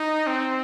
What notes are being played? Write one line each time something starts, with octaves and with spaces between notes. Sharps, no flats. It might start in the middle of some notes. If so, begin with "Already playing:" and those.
Already playing: D#4
C4